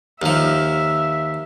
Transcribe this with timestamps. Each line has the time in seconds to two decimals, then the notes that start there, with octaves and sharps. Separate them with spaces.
0.22 D#2 F3 E5